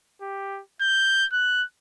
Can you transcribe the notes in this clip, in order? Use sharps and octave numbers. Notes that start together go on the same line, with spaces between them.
G4
G6
F#6